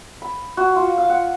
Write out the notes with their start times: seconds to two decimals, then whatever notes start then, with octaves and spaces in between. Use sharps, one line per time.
0.22 B5
0.57 F#4
0.76 F4
0.98 F5
1.10 F#5